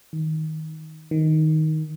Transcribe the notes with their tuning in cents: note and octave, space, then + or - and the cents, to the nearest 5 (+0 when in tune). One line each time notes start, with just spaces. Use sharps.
D#3 +15
D#3 +10